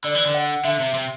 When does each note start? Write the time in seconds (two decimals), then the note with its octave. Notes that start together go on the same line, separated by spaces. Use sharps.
0.04 D3 D5
0.15 E3
0.26 D3
0.34 F#5
0.64 D3 E5
0.80 C3
0.94 C3